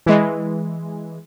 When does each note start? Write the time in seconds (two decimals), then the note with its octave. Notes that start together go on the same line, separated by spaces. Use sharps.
0.06 E3 G#3